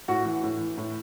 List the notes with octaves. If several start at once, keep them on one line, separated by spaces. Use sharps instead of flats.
A2 F#4 F#5
E3
A2
E3
A2